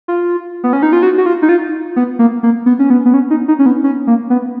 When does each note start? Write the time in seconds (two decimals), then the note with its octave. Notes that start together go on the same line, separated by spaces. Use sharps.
0.08 F4
0.64 B3
0.73 C#4
0.83 D#4
0.93 F4
1.03 F#4
1.18 F#4
1.26 F4
1.42 D#4
1.49 F4
1.96 B3
2.19 A#3
2.43 A#3
2.66 B3
2.79 C#4
2.90 B3
3.05 B3
3.14 C#4
3.30 D#4
3.48 D#4
3.59 C#4
3.66 B3
3.84 C#4
4.07 A#3
4.30 B3